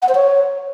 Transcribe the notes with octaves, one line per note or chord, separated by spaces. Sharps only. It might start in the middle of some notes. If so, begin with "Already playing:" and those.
F#5
C5
C#5